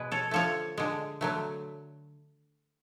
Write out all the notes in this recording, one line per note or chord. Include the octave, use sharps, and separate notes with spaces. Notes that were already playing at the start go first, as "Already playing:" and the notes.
Already playing: B2 G#3 B4
A4 C#5
D3 F3 A3 A4 C#5
D3 G#3
D3 F#3 A3